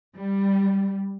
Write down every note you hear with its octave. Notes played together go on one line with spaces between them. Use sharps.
G3